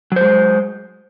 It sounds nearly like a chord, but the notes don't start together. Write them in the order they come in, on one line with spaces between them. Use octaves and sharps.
F#3 C5 G#3